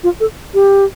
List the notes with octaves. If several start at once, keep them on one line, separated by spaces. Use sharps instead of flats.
F4
A4
G4